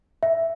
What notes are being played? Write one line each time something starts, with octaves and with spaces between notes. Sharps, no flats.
E5